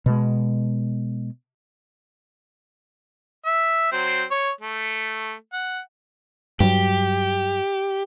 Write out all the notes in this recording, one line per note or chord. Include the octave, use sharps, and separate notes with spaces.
B2 G#3
E5
F#3 C4
C#5
A3
F#5
G2 F#3 G4